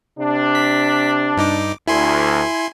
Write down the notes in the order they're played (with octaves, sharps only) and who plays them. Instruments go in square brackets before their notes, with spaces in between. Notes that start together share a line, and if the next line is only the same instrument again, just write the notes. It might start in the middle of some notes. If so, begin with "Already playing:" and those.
[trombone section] C3 D4
[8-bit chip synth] B6
G2 D#4 D6
[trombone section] D2 [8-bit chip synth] E4 G#5 C6